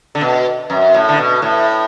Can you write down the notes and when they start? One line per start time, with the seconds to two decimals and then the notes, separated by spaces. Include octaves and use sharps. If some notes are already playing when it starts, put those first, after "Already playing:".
0.15 D3
0.21 B2
0.70 F#2
0.94 A2
1.08 D3
1.18 B2
1.42 A2